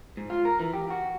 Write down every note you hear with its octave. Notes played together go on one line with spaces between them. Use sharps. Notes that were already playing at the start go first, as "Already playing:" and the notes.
G#2
F4
A#4
E3
G4
F#4